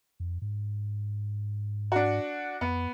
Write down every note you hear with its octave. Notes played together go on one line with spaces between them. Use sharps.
F2
G#2
D4 F#4
F2 B3